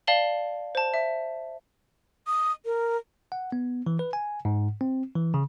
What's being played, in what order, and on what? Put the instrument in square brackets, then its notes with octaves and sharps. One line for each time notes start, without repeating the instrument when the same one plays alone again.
[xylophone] D5 F5 A5 F#7 G7
C5 A5
E5
[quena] D#6
A#4
[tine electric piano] F#5
B3
E3
B4
G#5
G#2
C4
E3
C#3